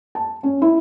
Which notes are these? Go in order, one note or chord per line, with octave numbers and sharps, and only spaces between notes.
A5
C#4
E4